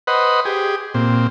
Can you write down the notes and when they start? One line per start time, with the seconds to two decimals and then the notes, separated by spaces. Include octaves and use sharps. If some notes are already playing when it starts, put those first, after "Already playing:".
0.07 B4 C5 D#5 F#5
0.45 G4 G#4
0.94 A#2 C4